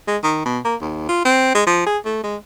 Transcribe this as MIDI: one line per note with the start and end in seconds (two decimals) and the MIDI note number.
0.07 0.17 56
0.23 0.41 51
0.46 0.59 47
0.65 0.76 58
0.81 1.05 39
1.09 1.24 65
1.25 1.51 60
1.55 1.63 56
1.66 1.84 53
1.86 1.98 68
2.05 2.22 57
2.23 2.36 56